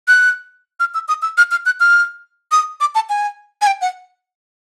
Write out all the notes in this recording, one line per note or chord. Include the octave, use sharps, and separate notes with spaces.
F#6
F6
E6
D#6
E6
F6
F6
F#6
F6
D#6
D6
A5
G#5
G#5
G5
F#5